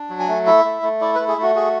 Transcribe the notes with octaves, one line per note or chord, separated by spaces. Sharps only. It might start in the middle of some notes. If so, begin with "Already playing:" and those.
Already playing: D4
F#3
G#5
A3
E4 E5
A3
A3
E4 D5
A3 B4
G#4
A3 F#4
F#4 G#4